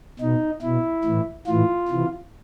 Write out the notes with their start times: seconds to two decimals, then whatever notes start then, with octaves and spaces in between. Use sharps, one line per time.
0.20 B2 D#4
0.62 B2 E4
1.04 A2 E3
1.47 A2 E3 F4
1.88 C3 E3